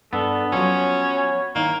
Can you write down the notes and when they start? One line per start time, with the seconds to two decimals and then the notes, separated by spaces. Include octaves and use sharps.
0.13 G2 B3 D4 A4
0.52 F3 F#3 C#4 C#5
1.55 D#3 A#3 D#4 E4